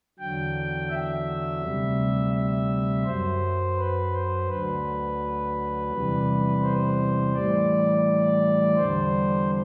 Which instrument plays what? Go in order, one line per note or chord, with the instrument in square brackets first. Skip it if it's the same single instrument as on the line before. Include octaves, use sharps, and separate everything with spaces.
[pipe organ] E2 D3 F#3 G5
E5
D2 C3 G3
E5
F#2 F#3 C5
B4
C5
D2 D3 F#3 B4
E2 C3 E3 G3
C5
A2 E3 G3 D5
E2 D3 G3 C5